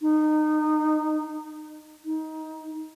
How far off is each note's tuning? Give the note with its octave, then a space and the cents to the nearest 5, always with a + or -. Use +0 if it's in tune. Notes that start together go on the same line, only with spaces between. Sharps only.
D#4 -25
D#4 +20